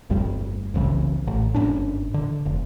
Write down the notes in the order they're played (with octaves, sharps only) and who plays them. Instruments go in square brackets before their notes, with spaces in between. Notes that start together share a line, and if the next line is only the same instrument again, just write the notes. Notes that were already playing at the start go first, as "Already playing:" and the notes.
[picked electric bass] G1 F2 G3
F1 C2 C#3 E3
A1
G1 G#2 C#4 D4
D3
F1